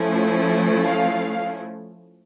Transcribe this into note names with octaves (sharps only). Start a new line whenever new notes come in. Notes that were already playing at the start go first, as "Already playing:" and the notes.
Already playing: F3 A3 C#4 E4
F5